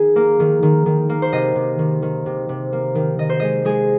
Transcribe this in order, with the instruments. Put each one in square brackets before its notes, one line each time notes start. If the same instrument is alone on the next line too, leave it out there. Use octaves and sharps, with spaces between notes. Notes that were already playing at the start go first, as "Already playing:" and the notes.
Already playing: [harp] D#3 G#4
A#3
D#3
D#3
D#3
A#3
C5
C3 D#5
C3
D#3
D#3
C3
C3
A#3
D#3
D#3 D#5
C5
G#3 D#5
G#3 G#4